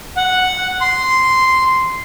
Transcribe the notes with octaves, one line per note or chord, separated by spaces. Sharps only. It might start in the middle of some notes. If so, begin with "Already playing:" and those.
F#5
C6